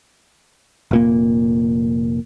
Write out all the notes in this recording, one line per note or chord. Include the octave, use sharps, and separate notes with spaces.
F1 A#2 A#3